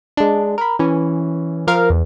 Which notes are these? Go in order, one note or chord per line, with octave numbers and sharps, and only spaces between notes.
G#3 D4
A#4 B5
E3 C#4
F3 A#4 F5
E2